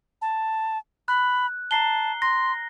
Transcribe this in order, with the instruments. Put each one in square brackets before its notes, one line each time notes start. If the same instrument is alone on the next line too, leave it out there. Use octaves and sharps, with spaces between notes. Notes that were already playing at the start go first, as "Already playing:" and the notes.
[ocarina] A5
[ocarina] B5 [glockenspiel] F#6
[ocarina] A5 [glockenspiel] A#5 C7 G7
[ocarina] C6 [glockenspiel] A#6